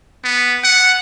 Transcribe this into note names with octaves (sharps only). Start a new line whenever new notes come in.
B3
F#5